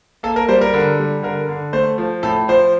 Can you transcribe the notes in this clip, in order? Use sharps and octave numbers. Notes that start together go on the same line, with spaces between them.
A#3 A4
A#4
G3 C5
A#4
D3
G3
D3 A#4
D3
A3 C5
F3
A2 A4
F3 C5